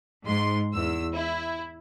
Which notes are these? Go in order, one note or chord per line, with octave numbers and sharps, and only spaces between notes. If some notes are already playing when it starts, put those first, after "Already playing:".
G#2 C6
E2 E6
E4